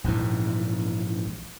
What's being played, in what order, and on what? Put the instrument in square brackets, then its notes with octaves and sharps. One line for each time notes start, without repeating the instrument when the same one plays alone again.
[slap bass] A#1 G#2 B2 E3